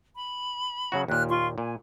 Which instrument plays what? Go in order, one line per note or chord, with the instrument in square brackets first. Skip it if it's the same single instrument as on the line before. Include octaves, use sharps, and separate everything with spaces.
[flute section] B5
[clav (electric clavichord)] C#3 F#3 F#4
[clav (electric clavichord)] D#2 A#2 [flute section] F6 F#6
[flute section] F4 C6 C#6
[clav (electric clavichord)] A#2 [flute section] G#5